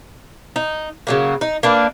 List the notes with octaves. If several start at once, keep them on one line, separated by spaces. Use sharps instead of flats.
D#4
C#3 F#3 A#3
D#4
A#3 D4 B4